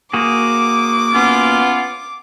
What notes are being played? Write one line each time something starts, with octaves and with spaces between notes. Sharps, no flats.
A#3 F#4 G#4 D6
B3 C#4 F4